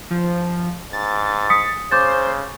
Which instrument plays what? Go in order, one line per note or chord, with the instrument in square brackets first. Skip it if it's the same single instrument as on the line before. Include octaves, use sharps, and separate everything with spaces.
[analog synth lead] F3
[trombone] G#2 [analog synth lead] A6
[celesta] D#6 B6 C#7
[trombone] C#3 [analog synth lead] C5 [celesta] D6 G6 A6